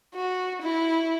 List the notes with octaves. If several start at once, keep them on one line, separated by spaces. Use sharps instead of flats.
F#4
E4